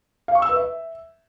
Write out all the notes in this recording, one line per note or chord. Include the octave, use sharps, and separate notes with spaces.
F5
C#6
E6
B4
E5